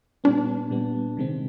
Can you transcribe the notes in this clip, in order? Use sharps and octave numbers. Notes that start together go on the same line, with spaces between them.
A#2 G3 B3 D4
A#2 G3 B3
C3 D#3 G#3 C4